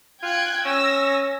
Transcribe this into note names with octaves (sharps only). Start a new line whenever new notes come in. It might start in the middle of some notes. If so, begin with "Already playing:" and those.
F4 G5 F#6 G#6
C#4 E6 A#6